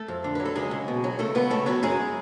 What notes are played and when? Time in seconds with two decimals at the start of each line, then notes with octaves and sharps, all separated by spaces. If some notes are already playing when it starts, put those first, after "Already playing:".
Already playing: A3 A4
0.08 F2
0.24 D3
0.35 F#3 B4
0.45 A4
0.55 C#2 G#3 G#4
0.71 C#2
0.88 B2
1.04 F#3
1.19 C#2 A3 A4
1.35 C#2 B3 B4
1.50 C#3 A3 A4
1.66 F#3 B3 B4
1.83 F#2 G#3 G#4